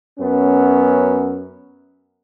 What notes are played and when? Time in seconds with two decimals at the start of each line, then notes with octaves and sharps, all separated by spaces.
0.19 F#2 B3 C#4